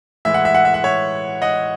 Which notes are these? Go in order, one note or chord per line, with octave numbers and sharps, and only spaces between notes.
A2 E3 G#3 E5
F#5
E5
F#5
E5
F#5
C#5 E5
D#5 F#5